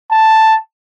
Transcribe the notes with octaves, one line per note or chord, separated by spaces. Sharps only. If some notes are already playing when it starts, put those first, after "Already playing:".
A5